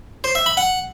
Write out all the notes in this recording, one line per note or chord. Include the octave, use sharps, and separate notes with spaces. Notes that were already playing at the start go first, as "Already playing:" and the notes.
C5
E5
B5
F#5